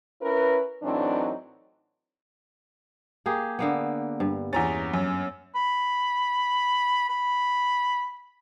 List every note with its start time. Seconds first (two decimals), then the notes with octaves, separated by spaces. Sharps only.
0.22 C#4 E4 A#4 B4
0.83 A2 E3 F#3 C4 D4 D#4
3.26 A#3 G4 G#4
3.59 D3 A#3 B3
4.20 G2
4.53 E2 C#4 A#5 A6
4.94 F#2
5.55 B5
7.09 B5